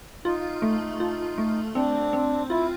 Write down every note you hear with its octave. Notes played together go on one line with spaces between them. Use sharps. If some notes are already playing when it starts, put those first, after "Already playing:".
D#4 F4
A3
F4
A3
C4 D4
C4
E4 F4